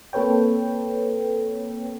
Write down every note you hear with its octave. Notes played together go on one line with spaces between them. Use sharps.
A#3 C4 A4 B4 C#5 G5